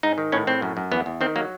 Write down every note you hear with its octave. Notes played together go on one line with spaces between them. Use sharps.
G#2 D#4
D#3
A2 C#4
A2 C4
F#2
F#2
E2 B3
E2
D#3 C4
F#3 A#3